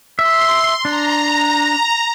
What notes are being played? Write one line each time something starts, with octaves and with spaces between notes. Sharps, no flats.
E5 C6
D4 A#5